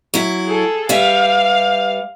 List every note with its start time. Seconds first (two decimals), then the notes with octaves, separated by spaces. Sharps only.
0.14 F#3 E4
0.45 G#4 A4
0.89 G3 B4 E5 F5